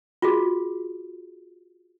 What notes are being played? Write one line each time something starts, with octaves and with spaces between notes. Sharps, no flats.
F4 F#4 G#4